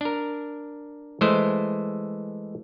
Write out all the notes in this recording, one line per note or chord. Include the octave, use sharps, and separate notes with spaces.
D4 A#4
E3 G#3 A3 C5